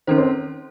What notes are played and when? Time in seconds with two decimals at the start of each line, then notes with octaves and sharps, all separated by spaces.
0.07 D#3 C#4 A4 C5
0.18 C4